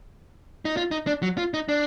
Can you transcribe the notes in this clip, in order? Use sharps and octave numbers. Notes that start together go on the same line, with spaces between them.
D#4
F4
D#4
D4
F#3
F4
D#4
D4